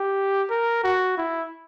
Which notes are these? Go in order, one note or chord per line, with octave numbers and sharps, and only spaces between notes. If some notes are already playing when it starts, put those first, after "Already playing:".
Already playing: G4
A#4
F#4
E4